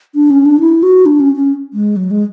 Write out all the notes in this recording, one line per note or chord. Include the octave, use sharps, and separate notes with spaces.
D4
C#4
D4
E4
F#4
D4
C#4
C#4
G#3
F#3
G#3